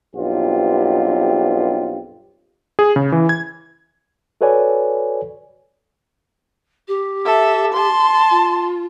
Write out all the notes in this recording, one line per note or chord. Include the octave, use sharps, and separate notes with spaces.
B1 G2 C4 F4 G4
G#4
C#3
E3
G#6
F#4 A4 B4 C#5 D5 G#5
G4
A4 E5
A5 C6
F4